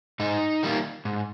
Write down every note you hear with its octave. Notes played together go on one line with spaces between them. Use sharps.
G#2 D#4
D#3 G3 A#3
G#2